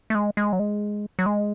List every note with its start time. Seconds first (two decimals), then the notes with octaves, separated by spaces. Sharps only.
0.10 A3
0.15 G#3
0.37 G#3
0.53 F#3
0.59 G#3
1.19 F#3
1.26 G#3